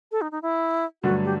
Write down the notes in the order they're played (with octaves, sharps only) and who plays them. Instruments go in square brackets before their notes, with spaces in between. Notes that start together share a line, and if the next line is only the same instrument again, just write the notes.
[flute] A4
D#4
D#4
E4
[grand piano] G2 D3 F#3 A3 [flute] F#4
[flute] G4